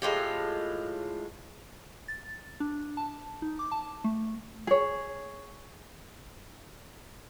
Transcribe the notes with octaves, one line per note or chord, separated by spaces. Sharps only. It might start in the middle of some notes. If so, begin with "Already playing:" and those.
A2 G#3 F4 G4
A6
D4
A5
D#4
D6
A5
A3
G#4 C#5